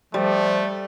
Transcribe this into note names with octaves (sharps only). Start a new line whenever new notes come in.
F3 G3 A3